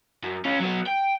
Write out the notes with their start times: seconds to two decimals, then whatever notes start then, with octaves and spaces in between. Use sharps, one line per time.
0.23 F#2
0.45 C#4 F4
0.60 F#3 B3
0.86 G5